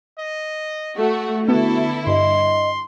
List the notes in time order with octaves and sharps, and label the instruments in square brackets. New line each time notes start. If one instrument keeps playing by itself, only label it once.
[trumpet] D#5
[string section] A3 F#4
[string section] D3 E4 [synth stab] B3 [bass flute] F#4 [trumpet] A4
[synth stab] G2 [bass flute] D#5 [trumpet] C6